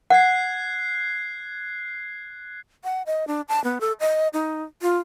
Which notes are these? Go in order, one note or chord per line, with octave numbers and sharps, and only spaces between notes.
F#5 F#6 G#6 C7
F#5
D#5
D4
A5
B3
A4
D#5
D#4
F4